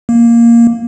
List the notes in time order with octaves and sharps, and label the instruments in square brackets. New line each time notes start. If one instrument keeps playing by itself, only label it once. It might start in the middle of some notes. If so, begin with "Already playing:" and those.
[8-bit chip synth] A#3